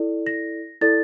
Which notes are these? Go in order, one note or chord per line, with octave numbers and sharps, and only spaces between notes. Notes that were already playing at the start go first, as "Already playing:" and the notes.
Already playing: E4 A4 D5
A#6
E4 A4 D5 A6